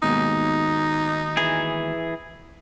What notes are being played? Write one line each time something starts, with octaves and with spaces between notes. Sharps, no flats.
D#2 G#2 B2 D#4
E3 G#4